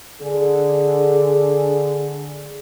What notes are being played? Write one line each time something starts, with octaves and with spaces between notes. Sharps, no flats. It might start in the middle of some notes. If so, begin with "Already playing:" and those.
D3 G#4